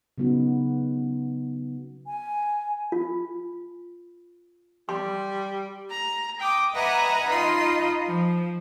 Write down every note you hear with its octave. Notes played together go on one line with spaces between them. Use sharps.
C#3 F#3 B3 D#4 F#4
G#5
F4
G3 C6
A#5
G5 D6 D#6
B4 D#5 E5 F#5 G#5 A#5
D#4 F4 D#5 B5 C6
F3